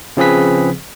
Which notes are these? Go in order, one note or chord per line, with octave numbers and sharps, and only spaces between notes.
C#3 F3 C4 G#4 B4 B6